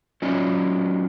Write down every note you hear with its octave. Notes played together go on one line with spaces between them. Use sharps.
F#3 C#4 D#4 F4 D5